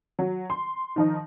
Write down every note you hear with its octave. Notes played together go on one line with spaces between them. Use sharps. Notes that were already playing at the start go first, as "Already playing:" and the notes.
F#3
C6
D#3 F3 D#4